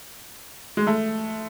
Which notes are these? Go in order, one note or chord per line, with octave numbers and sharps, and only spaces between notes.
G#3
A3